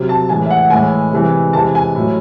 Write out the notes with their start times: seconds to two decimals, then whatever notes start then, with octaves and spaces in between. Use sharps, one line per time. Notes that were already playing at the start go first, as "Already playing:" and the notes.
Already playing: C3 F#3
0.09 A5
0.29 A2 E3 G#3 G#5
0.46 E5
0.50 F#5
0.70 A2 E3 G#3 G#5
1.12 C3 E3 G#3
1.53 C3 E3 G#3 A5
1.75 G#5
1.95 A2 F#3